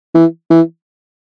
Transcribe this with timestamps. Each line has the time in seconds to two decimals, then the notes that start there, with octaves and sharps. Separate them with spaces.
0.15 E3
0.50 E3